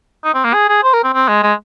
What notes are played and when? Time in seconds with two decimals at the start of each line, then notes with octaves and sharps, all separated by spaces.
0.24 D#4
0.34 C4
0.44 A#3
0.53 G#4
0.69 G#4
0.83 C5
0.94 A#4
1.04 C4
1.14 C4
1.28 G#3
1.43 G#3